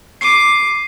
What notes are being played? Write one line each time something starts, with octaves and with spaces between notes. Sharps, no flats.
D6 C7 D#7